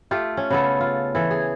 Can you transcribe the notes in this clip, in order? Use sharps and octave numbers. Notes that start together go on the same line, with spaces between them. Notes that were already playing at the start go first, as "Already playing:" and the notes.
A3 F4 G4
C#4
C#3 B3 A4
F4
E3 A4
G#4